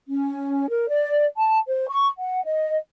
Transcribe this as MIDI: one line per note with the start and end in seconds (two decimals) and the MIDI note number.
0.10 0.66 61
0.70 0.88 70
0.89 1.24 74
1.37 1.58 81
1.67 1.86 72
1.89 2.07 85
2.19 2.43 78
2.45 2.75 75